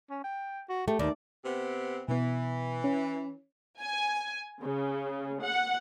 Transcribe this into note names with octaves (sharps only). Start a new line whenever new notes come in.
C#4
G5
F#4
A3 G4
D#2 D5
C3 B3 C4
B2 E3 B3
C#4
G#5
C#3
F#5